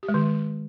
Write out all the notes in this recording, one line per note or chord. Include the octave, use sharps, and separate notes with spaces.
G4
G#3
D#3